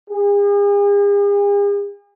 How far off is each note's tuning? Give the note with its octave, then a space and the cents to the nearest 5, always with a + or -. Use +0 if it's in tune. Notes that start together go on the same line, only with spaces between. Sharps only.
G#4 -45